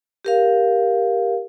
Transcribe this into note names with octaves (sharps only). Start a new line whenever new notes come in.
G4 A#4 F5